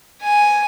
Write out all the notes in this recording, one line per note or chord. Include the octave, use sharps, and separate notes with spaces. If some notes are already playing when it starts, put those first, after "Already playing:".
G#5